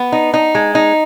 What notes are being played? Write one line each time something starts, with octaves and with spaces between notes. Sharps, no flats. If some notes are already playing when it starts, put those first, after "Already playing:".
Already playing: B3
D#4
D#4
G#3
D#4